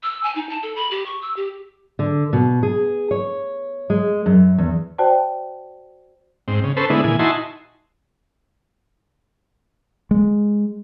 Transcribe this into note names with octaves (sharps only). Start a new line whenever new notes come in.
E6
G#5
D#4
A5
A4
B5
G4
C#6
E6
G4
D3
B2
G#4
C#5
G#3
F#2
E2
F#4 C5 D5 G5 A5
G#2 C4
C#3
C#4 A4 B4 C5
D3 G#3 B3 E4
A#2 E3 G#5
D#4 E4 F#4 G#5 A5 C6
G#3